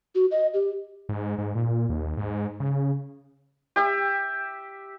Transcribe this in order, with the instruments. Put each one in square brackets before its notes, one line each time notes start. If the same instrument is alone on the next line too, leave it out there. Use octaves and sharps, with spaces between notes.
[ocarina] F#4
D#5
G4
[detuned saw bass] G#2
G#2
A#2
D#2
G#2
C#3
[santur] G4 E5